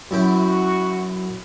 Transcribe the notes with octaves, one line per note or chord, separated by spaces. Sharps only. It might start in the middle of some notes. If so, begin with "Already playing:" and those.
F#2 E4 F#4 G5